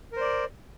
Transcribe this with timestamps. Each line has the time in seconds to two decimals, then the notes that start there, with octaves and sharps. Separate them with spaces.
0.13 A#4
0.17 C5
0.21 D5